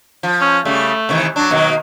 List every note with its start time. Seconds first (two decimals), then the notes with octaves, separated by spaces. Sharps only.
0.23 F3
0.41 C#4
0.65 C#3 G3 A3
1.09 C3 D#3 E3
1.36 F#3 D4
1.51 B2 D#3 A#3